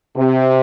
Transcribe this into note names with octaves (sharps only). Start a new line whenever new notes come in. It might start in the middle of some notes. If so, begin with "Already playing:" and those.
C3